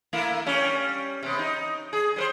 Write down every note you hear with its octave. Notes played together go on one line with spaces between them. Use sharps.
A3 A#3 E4
G3 C#4
C3 B3
D#4
G#4
G3 B4 C5